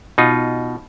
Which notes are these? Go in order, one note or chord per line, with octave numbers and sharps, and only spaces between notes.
B2 D#4 F4